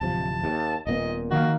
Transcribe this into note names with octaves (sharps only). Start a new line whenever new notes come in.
D1 C3 F3 A5
D#2
D#1 A#2 B3 D#5
D#3 A#3 F#4 F5